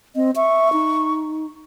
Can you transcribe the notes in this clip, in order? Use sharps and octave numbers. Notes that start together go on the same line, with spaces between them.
C4 D#5
E5 C#6
D#4